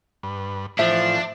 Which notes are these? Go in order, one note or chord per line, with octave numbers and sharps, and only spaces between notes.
G2 B4
A2 E3 F3 D4 E5